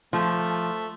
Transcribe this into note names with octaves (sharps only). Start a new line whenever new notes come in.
F3 A3